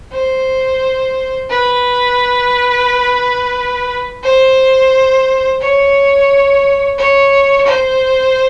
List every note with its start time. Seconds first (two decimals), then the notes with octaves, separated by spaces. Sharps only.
0.12 C5
1.50 B4
4.23 C5
5.61 C#5
6.98 C#5
7.66 C5